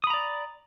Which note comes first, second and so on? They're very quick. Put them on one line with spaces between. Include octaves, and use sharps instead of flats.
D#6 B5 A#5 D5